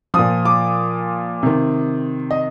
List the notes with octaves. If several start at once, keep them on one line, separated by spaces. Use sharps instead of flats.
A#2 F3 D#6
D6
C3 D#3
D#5